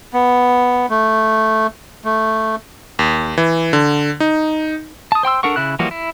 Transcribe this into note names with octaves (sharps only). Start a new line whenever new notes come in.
B3
A3
A3
D#2
E3
D3
D#4
A5 D#6
C5 G5 C6 E6
D4 A4 A#4 F#5 C#6
C#3 E4 F#6
E3 F3 G3 A#3 F#4
E4